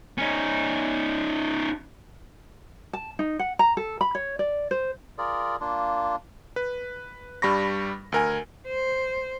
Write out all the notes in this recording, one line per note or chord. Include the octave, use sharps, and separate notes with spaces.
C#4 D#4
A5
D#4
F#5
A#5
A4
B5
C#5
D5
C5
F4 G#4 A#4 D5
A#3 D4 F4
B4
G2 G3 B5 C#6 A#6
D2 A#4 G#5
C5